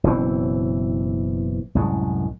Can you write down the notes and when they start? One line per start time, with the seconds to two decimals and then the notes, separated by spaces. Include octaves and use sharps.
0.04 F#1 B2 E3 C4
1.75 C2 F#2 A2 G#3